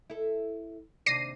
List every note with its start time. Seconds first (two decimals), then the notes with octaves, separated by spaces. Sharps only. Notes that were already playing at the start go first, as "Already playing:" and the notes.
0.10 E4 A4
1.06 D#2 C3 D4 A#6 C7 D#7